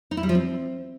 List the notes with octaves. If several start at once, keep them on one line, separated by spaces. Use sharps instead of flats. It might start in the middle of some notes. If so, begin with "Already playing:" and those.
D#4
E4
G3
F3
C4